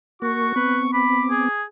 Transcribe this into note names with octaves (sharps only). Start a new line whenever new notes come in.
A#3 F#4 A#4 C#6
B3 C4 B4
B5 D6
G#4